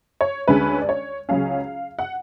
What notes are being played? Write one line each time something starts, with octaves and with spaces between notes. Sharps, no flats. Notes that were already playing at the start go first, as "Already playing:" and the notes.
C#5
D2 D3 G#3 C#4 B4
D5
C#5
C#2 C#3 F#3 C#4 F5
F#5